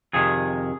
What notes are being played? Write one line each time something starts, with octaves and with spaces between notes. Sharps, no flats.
F2 C3 D#3 G#4